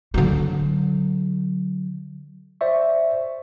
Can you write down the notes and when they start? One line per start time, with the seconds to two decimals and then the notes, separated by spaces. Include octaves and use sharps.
0.14 D3 F#3
2.61 C5 D5 E5 C#6